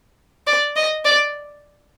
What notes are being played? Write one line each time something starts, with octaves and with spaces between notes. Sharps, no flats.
D5
D#5
D5